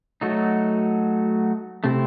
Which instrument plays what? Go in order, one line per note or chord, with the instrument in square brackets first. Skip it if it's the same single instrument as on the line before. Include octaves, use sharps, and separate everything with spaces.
[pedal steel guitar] F#3 A3 D#4 F#4
[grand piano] C3 [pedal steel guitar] A3 C4 E4